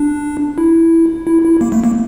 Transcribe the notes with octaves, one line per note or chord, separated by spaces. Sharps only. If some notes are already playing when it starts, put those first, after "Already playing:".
Already playing: D4
E4
E4
E4
A#3
A3
A#3